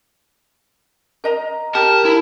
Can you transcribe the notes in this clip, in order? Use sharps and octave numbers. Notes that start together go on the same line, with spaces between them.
A#4 D#5 A#5
G4 A#4 A5
E4